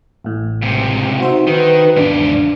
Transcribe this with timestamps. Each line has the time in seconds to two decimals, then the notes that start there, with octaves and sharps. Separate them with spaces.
0.24 A1 A2
0.62 C#2 C3
1.20 D#4 F#4 C5 E5
1.47 D#3 B4
1.96 G#1 E2 G#2 C#3 D4 D5